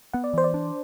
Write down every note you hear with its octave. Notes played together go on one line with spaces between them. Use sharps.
B3 F#5
D5
E3 C5
D5
D4